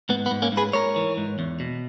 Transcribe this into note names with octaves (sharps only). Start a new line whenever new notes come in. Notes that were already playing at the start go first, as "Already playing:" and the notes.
G#2 B3
B3
G#2
A#3 C#4
G#2
G#4 B4
G#2 A#4 C#5
E3
G#2
E2
B2